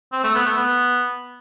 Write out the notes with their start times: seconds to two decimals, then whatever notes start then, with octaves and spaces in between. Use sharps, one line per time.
0.13 C4
0.24 A3
0.35 B3
0.46 A3
0.57 B3